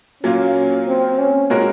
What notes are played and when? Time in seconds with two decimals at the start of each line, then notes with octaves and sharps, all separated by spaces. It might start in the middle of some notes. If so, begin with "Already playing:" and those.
0.23 A#2 F#3 A#3 C#4 F4
0.87 C4
1.18 C#4
1.50 A#2 G#3 C#4 F#4 A#4